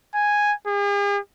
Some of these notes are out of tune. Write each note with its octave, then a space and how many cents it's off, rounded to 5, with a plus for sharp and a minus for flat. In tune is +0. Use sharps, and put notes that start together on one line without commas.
G#5 -5
G#4 -45